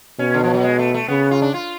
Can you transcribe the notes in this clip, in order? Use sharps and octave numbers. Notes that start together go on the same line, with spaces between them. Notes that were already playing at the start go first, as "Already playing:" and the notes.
B2 C#4
D3
F3
F#3
G#3
A3
A3
C#3 B3
F4
D4
F4